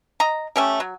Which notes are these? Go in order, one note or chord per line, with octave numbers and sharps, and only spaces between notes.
D#5 A#5
A3 C#4 G4
F#3